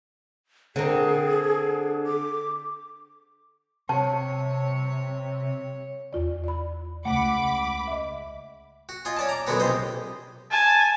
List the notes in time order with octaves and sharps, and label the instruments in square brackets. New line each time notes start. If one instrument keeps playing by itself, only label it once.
[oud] D3 C4 A#4 [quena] G#4
[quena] D6
[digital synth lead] C3 [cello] C#5 [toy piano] A5
[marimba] E2 F4 D5
D5 B5
[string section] C#2 B5 D6 [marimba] A3 [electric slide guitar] F#5
[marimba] D#5 E5
[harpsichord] F#4
F4 D#5 G#5
C#4 D5 A5
A#5 D6
F#2 B2 D3 G#3 B3 F#4
A#1 C3 C5 D#5
[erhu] G#5 [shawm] A5